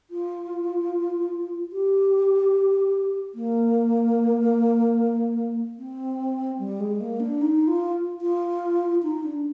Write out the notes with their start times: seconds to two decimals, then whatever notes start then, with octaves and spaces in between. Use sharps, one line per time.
0.10 F4
1.72 G4
3.35 A#3
5.79 C4
6.59 G3
6.80 G#3
7.01 A#3
7.20 D4
7.41 D#4
7.67 F4
8.21 F4
9.03 D#4
9.24 D4